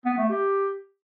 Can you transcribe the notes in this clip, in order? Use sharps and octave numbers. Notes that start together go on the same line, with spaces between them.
B3
A3
G4